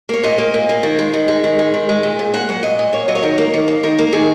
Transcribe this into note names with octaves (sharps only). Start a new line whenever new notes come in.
A#3 C#5
A#2 D#5
A#3
A#2
A#3
D#3
G#3
D#3
G#3
D#3
G#3
D#3
G#3
A#2
A#2
A#3 F#5
F#3 F#5
A#2 D#5
A#2
A#3 C#5
F#3 D#5
C#5
D#3 A#4
A#3
D#3
A#3
D#3 A#4
A#3
D#3 G#4